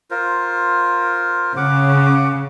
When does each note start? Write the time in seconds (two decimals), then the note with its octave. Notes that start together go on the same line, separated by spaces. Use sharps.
0.11 F4 A#4 C5
1.57 C#3 F#5 D6